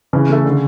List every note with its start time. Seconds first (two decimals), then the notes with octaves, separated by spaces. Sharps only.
0.13 C#3 E3
0.29 A3 E4 A4 E5
0.45 D3